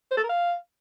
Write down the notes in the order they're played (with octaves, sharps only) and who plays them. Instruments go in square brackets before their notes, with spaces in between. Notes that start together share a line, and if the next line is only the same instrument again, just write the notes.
[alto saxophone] C5
A4
A#4
F5